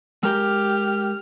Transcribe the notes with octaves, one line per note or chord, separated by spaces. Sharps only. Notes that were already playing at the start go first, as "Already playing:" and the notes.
G#3 G4 A#4 G5 F6